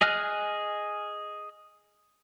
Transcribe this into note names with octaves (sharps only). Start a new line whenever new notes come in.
G#4 D#5 G#5 F6 F#6